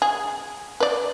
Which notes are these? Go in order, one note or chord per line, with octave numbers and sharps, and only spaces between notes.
G#4
B4 D5